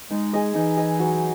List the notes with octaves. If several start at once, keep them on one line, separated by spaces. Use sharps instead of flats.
G#3 D#4
G#4 D#5
E3 D#4
G#4 D#5
F#3